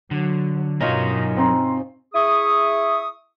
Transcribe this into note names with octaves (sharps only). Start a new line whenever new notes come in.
D3 F#3
G2 B2 F#3 C#4 D#4 F4 A#4
C4 A#5 C6
E4 G#4 E5 C#6 D#6